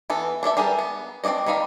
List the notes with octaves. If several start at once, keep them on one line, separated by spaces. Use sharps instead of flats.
E3 B3 A4
D4 A4 D5 E5
G3 G#4 A#4 B4 A5
B3
C4 D4 G#4 D5 D#5
D#3 G3 D#4 F5 B5